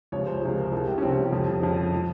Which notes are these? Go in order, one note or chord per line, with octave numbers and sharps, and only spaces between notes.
C#2 C3 F3 C#5
C5
C#2 C3 F3 G#4
A#4
C2 C3 F3 G#4
G4
C#4
C2 C3 F3 C4
C#4
G4
F2 C#3 F3
F2 C#3 F3
F3